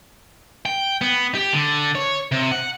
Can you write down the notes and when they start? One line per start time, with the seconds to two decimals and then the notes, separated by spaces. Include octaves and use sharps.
0.66 G5
1.01 B3
1.35 G4
1.53 D3
1.95 C#5
2.32 C3
2.52 F#5